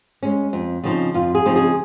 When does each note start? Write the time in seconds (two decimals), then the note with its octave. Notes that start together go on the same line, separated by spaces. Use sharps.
0.23 G#3 C#4
0.53 F2
0.84 C#3 F3 C4 D#4
1.14 F2 F4
1.35 G#4
1.46 C#3 F3 C4 D#4
1.56 G#4